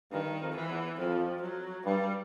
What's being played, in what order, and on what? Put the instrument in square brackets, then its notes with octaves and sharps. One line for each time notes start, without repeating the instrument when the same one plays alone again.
[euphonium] G2 [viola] D#3
[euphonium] F2
[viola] E3
[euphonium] E2
[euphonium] F2 [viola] F3
[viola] F#3
[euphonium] G2 [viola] G3